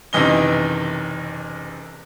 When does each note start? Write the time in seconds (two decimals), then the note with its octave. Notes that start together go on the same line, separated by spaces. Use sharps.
0.13 F#1 C3 D#3 E3 D#5 G7